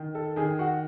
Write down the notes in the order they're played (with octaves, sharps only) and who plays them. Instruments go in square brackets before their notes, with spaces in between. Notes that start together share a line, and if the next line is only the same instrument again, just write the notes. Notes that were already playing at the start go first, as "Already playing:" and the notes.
Already playing: [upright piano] D#3
[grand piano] A4
[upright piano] D#3 [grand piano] G#4
[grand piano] F#4